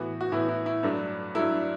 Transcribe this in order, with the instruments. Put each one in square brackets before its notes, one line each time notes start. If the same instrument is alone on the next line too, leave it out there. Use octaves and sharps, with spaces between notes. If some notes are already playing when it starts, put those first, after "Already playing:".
Already playing: [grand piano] A2 E3 B3 F#4
F#4
A2 E3 B3 E4
E4
E4
G2 F#3 A3 D4
G2 F#3 A3 E4
D4